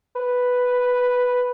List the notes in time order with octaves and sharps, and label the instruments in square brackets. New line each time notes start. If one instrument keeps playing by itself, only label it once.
[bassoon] B4